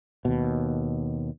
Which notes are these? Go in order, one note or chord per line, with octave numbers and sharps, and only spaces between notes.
D#2 B2